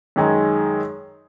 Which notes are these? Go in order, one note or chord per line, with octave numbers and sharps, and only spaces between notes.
F#2 D#3 G#3 D#4 G#4